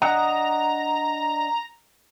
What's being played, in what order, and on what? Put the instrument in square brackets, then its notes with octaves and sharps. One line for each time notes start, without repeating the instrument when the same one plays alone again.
[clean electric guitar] D4 D#5 F#5 [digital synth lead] A#5